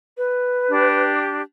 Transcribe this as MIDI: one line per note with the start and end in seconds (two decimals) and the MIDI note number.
0.17 1.10 71
0.69 1.41 62
0.69 1.41 67